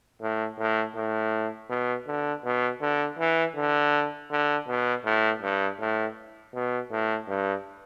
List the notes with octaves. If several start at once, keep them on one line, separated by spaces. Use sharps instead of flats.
A2
A2
A2
B2
D3
B2
D3
E3
D3
D3
B2
A2
G2
A2
B2
A2
G2